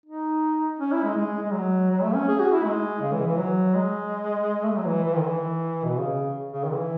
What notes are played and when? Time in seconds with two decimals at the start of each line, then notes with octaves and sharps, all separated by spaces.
0.06 D#4
0.79 C#4
0.93 E4
1.04 G#3
1.17 G#3
1.42 G#3
1.53 F#3
1.91 F#3
2.03 A3
2.15 C#4
2.28 G#4
2.40 F#4
2.52 E4
2.65 G#3
3.02 C#3
3.14 E3
3.26 E3
3.39 F#3
3.75 G#3
4.63 A3
4.70 G#3
4.78 F#3
4.86 E3
5.04 E3
5.16 D#3
5.23 E3
5.84 B2
5.98 C#3
6.53 C#3
6.65 D#3
6.72 E3